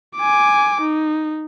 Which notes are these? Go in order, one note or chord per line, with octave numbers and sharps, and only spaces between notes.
G#5 D6
D#4